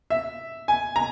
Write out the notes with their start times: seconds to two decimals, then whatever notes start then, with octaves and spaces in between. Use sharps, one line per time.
0.10 E5
0.68 G#5
0.96 A#5